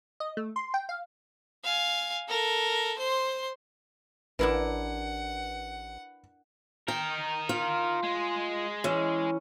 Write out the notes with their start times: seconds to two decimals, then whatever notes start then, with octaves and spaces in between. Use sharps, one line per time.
0.20 D#5
0.37 A3
0.56 C6
0.74 G5
0.89 F5
1.64 F5 G#5
2.28 A4 A#4
2.98 C5 C6
4.39 A1 D4 E4 A#4 B4 F#5
6.88 D#4 A#4 G5
7.49 F4
8.03 G#3
8.84 E3 C#4